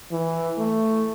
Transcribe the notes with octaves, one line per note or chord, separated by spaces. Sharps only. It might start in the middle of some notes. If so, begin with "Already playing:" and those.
E3
A3